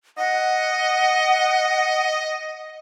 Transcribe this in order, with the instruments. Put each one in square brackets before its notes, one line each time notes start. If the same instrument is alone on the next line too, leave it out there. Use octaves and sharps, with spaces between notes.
[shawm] D#5 [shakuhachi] F#5